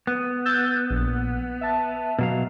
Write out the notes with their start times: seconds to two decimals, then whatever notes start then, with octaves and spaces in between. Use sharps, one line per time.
0.07 B3
0.45 E6 G6 A6
0.90 A#1
1.61 E5 A5
2.19 B2 F#3 F5